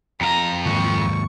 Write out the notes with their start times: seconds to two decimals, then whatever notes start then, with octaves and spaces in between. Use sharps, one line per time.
0.21 F2 F5 A#5
0.66 D#2 G#2 C#6